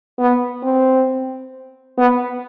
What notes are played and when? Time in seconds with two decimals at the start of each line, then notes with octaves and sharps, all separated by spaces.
0.19 B3
0.63 C4
1.98 B3